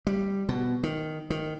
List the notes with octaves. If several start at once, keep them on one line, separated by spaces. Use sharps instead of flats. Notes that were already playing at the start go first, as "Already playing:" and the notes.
G3
B2
D#3
D#3